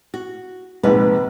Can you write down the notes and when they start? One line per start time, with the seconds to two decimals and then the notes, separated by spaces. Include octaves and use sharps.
0.14 F#4
0.83 A#1 G#2 C3 B3 B4